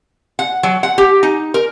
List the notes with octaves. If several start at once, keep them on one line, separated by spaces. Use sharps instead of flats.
F#5
F#3
F#5
G4
D#4
A#4